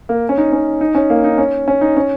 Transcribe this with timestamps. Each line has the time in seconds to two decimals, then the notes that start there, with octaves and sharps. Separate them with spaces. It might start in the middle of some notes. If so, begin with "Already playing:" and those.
0.09 A#3
0.29 C#4
0.38 D#4
0.52 C#4
0.81 D#4
0.95 C#4
1.10 A#3
1.24 D#4
1.38 C#4
1.68 C#4
1.81 D#4
1.97 C#4